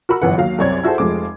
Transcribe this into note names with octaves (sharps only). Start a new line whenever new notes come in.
F#4 A#4 F#5 B5 E6
G1 F#2 E3 B4 F#5
D#2 F#3 F5
C2 F#2 C4 C#5 D5 G#6
E4 F#4 G#4 A4 C5
F1 F3 G#3 A3 D6